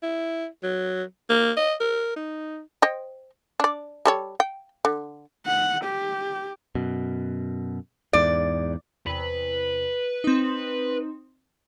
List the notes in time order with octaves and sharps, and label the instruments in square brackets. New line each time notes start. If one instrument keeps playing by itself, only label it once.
[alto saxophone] E4
F#3
A#3
D#5
A#4
D#4
[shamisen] C5 D#5 G5
D4 D5
G3 A4 C#5
G5
D3
[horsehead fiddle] F#5
G4
[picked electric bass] F#2 B2
[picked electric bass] E2 G#2 [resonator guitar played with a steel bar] D5
[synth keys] E2 C3 [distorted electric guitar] B4
[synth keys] C4 D#4